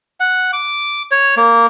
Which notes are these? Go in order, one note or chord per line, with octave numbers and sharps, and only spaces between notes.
F#5
D6
C#5
A#3